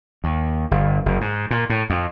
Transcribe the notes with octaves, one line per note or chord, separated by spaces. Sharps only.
D#2
G1
F#1
G#2
A#2
A2
F2